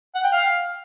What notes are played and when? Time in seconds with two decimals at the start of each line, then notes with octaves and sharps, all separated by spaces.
0.15 F#5
0.24 G5
0.33 F5